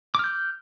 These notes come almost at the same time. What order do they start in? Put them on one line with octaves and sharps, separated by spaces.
D6 F6 G6